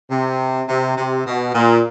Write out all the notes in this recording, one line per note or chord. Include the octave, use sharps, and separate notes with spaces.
C3
C3
C3
B2
A#2